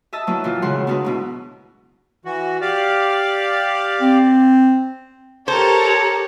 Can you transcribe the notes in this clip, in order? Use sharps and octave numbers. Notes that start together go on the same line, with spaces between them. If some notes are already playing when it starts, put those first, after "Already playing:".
D#5 E5 A5 E6
F#3 A#3 C#4 E4 B4
A#2 E3 F4
D#2 C#3 G#3 E4 F#5 C6
B3 D4 D#4 F#4 B4
G#2 B2 E4
E3 F#4
G4 D5 F5
C4
G4 A4 A#4 C5 C#5 G5 A5